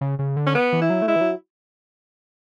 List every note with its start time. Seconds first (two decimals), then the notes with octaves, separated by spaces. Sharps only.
0.01 C#3
0.19 C#3
0.37 D3
0.47 C#4
0.55 B3
0.73 E3
0.82 E4
0.90 F#3
1.02 A3
1.08 G#3 E4
1.16 E3
1.21 F#3